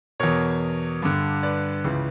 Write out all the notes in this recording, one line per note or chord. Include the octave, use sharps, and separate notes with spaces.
E2 B2 A#4 C#5
G2 D3
B4 D5
C#2 C#3 E3